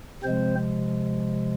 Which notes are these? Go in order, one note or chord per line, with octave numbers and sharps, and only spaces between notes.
C3 F3 G#3 C4 C5